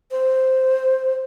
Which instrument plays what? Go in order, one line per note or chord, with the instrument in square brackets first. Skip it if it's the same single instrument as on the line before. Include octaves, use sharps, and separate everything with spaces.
[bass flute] C5